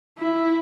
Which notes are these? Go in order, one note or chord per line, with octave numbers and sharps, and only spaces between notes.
E4